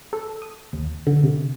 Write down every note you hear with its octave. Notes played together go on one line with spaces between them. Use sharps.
A4
D#6
D#2
D3
C3